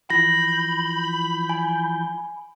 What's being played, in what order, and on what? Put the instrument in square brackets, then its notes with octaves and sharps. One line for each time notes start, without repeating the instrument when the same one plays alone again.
[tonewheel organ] E3 F3 G6 [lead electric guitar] B5 [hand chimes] A#6
[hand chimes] G#5